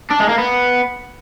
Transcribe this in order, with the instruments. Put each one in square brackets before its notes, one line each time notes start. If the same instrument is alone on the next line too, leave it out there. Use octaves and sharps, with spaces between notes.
[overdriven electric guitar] D4
G#3
A#3
B3